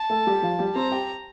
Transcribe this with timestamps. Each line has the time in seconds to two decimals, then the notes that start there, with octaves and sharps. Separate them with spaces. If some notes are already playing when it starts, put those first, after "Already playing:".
Already playing: A5
0.10 A3 A4
0.27 G3 G4
0.42 F3 F4
0.59 G3 G4
0.75 C4 C5 A#5
0.91 G4 G5